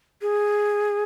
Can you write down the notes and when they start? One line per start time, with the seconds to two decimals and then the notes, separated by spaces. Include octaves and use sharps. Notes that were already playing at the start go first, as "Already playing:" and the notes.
0.22 G#4